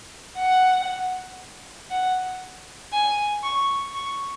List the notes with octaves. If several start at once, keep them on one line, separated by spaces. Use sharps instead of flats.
F#5
F#5
G#5
C#6
C#6